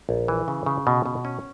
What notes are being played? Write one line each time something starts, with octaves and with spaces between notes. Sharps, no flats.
A#1
E3
C#3
C#3
B2
B2
C#4